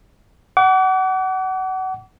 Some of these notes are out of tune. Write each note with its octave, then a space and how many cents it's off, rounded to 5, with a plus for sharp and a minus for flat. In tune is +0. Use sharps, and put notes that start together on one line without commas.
F#5 +25 D6 -40